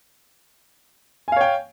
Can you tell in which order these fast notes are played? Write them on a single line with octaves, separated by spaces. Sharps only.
G#5 F5 C#5 G5